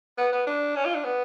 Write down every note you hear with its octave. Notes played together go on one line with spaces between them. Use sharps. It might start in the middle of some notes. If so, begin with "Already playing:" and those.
B3
B3
D4
C#4
F4
D4
B3